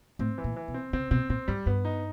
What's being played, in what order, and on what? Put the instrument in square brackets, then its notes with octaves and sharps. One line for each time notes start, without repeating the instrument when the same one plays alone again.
[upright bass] A2 [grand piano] C4
[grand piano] E3
[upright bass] A#2
[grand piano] E3
[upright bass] B2
[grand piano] C4
[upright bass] C#3 [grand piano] C4
[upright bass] B2 [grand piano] C4
[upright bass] A#2 [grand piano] C4
[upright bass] G#2 [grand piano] G3
[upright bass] G2 [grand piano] B3
[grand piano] D#4